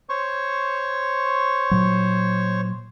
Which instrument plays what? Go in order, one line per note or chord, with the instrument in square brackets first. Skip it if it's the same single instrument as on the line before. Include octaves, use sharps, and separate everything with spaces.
[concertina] C5 C#5 C#6
[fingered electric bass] A#2 F#3